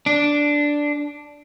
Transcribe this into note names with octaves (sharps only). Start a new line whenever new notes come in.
D4